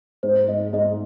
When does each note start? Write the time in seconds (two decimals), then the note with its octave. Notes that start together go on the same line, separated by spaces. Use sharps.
0.23 G#2 C5
0.48 G#2 D#5
0.73 G#2 D#5